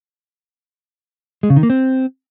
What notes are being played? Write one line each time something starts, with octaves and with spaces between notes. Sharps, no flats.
G#3
C#3
D#3
A#3
C4